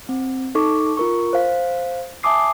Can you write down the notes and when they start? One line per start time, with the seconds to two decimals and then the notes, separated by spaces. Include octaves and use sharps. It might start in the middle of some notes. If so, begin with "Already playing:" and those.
0.09 C4
0.55 D#4 A4 C#6 D6
0.97 F4 A#4 C#6
1.33 C5 F5
2.23 E5 G#5 A5 D6 D#6 C7